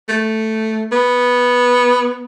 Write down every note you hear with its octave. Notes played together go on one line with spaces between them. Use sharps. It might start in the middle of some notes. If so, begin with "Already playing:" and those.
A3
B3